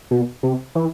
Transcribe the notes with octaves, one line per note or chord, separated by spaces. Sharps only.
B2
C3
E3